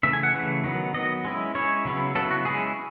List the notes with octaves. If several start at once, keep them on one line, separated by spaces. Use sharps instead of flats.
C#3 E3 A3 E5
G#5
F#5
C#3 E3 A3
D#3 F#3 B3
D#3 F#3 B3 D#5
G#3 C#4 E4
G#3 C#4 E4 C#5
C#3 F#3 B3 E4
C#3 F#3 B3 E4 A4
F#4
G#3 C#4 E4 G#4